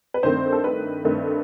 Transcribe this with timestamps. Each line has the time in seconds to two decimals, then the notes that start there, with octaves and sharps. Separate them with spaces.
0.14 B4
0.22 G2 D#3 A3 C4 C5
0.52 A4
0.64 B4
1.05 G2 D#3 A3 C4